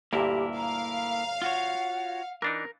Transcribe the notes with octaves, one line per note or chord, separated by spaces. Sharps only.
D2 G2 A#2 A#3 E4 G4 A#4
F5 A#5
F4 F#4 C#5 F#5
E3 D4 D#4 A#4